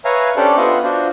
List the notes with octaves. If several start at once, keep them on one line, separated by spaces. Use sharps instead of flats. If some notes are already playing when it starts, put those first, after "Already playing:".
B4 C#5 E5 F5 G#5 A#5
C#4 D4 G4 A4 C5 D5
B3 F4 D#5 E5 F#5 C6
D4 F4 F#4 C5